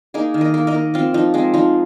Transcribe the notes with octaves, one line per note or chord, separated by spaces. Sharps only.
A#3 D#4 G#4
D#3
A#4 D#5
A#3
A#4 D#5
A#3
F3 C4 F4
F3 D#4
G#3 C4
F3 D#4